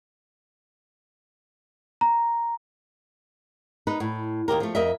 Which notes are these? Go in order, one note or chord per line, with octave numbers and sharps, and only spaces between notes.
A#5
D#4 B4
A2
D#2 G#2 G4 A#4
F3 A3
F2 A#4 D#5 E5